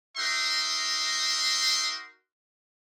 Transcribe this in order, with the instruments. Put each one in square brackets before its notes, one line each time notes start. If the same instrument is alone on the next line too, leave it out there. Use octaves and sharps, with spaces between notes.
[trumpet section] D#4 F#4 A#4 E5 C6